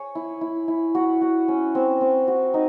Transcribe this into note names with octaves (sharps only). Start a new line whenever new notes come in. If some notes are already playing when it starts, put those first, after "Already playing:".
Already playing: G#4 C#5
E4
E4
E4
F#4
F#4
C#4
C4
C4
F#4
D#4